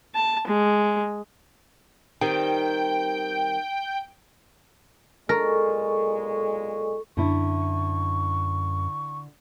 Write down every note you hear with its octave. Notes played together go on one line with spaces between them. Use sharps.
A5
G#3
D#3 G3 C4 G5
B1 A#2 G#3 A4 A#4 C#6
F#2 D3 E4 C#6